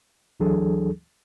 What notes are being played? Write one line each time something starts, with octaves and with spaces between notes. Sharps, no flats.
D2 E3 F#3 D4 G#4 A4